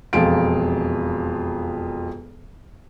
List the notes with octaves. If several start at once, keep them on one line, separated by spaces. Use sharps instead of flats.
E1 F2 F4 D7